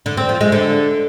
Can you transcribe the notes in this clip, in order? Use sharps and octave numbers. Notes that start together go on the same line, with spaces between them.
D3
C4
F3
G#3
D3